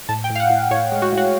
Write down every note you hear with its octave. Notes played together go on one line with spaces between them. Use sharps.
A2 A5
G5
A2
F5
F#5
A2
A2 C#5
G#3
F#4
A2
F#4